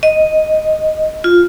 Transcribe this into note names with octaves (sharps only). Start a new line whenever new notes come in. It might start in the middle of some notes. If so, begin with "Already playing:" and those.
D#5
F4